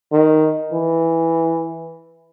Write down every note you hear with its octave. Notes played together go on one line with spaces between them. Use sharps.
D#3
E3